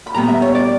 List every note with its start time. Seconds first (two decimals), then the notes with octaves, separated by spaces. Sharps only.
0.07 B5
0.15 A#2 G3 B3 A#5
0.28 E5
0.42 C#5
0.55 D5